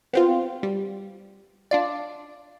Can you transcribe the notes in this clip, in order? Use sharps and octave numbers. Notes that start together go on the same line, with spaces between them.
B3 C4 F4
G3
D4 F4 D5